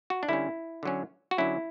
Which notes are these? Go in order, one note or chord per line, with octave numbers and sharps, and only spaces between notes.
F#4
D4
D3 G3 C#4 E4
D3 F#3 C#4
F#4
D3 F#3 C#4 E4